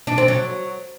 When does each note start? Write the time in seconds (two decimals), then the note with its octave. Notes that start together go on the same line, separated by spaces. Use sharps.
0.07 D4
0.18 C4
0.28 F#3